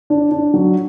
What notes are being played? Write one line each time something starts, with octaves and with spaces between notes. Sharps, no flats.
D4
D4
F#3